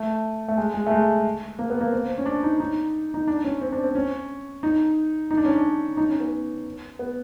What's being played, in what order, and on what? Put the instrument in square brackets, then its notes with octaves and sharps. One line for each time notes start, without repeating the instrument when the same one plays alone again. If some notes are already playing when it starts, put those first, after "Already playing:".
Already playing: [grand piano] A3
A3
G#3
G#3
A3
G#3
A#3
B3
A#3
C4
C4
C#4
D4
D#4
D#4
D#4
D4
C#4
C4
D4
C4
C#4
D#4
D#4
D4
C#4
D4
D#4
C#4
B3
B3